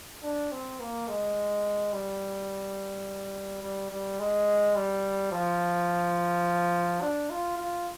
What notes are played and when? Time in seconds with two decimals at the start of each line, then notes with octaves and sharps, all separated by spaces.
0.23 D4
0.51 C4
0.80 A#3
1.08 G#3
1.93 G3
3.62 G3
3.90 G3
4.19 G#3
4.76 G3
5.32 F3
7.01 D4
7.30 F4
7.58 F4